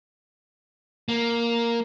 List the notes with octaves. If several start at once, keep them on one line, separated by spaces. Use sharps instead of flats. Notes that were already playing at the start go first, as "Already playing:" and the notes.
A#3